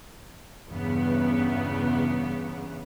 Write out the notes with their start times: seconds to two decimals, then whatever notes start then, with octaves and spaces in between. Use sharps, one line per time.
0.67 E2 G2 C#3 B3